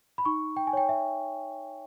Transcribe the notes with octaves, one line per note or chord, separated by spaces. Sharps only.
B5
D#4 C#6
G5
G#5
C#5 G5
E5